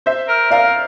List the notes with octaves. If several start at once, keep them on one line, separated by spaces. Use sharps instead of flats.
C5 E5
A#4
A#4 D5 F5